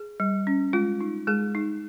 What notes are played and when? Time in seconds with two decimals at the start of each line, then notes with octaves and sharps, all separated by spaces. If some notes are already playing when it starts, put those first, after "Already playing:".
Already playing: G#4
0.20 G3
0.47 C#4
0.73 G#3 F4
1.01 D#4
1.27 G#3 G#4
1.55 D#4